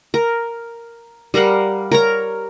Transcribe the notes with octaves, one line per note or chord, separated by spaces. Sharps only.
A#4
G3 A#4 F5 F#5
A#4 C#5 A#5